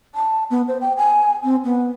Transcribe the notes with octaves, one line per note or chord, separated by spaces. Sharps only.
A5
B3
C5
G5
G#5
C4
B3